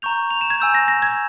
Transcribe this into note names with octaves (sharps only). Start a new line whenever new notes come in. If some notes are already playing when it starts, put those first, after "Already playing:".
A#5 C#6 G6 F7
F7
E7
G#6
G#5 E6 G6
A#6
A#6
G#6